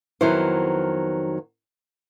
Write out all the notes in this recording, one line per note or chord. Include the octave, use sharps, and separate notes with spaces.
F2 D#3 F#3 B3 E4 C5